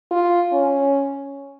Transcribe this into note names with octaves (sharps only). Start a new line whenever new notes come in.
F4
C#4